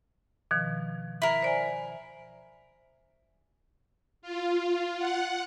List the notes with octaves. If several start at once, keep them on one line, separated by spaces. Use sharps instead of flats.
B2 D#3 F3
E4 A#4
C5 D5 G#5
F4
F#5